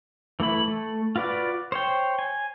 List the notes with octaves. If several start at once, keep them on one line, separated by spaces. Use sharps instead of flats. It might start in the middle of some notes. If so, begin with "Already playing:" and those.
E3 A3 E4 B5
A3
F4 F#4 B4 D5
C5 C#5 G5
G#5